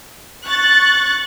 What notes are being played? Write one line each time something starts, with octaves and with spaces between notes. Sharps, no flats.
C#6 F#6 A6